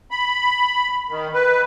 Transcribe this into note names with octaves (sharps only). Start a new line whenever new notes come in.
B5
D#3
B4